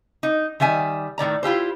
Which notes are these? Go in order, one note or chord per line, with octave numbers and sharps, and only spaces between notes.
D#4
D#3 G3 E5 G#5
A2 D#3 D5 A#5
E4 F4 G4 C5